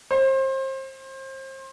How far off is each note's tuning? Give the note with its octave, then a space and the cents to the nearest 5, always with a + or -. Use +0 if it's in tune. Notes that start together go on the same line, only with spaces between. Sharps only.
C5 +30